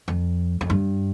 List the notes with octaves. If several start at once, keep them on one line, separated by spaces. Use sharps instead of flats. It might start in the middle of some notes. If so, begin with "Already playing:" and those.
F2
F2
G2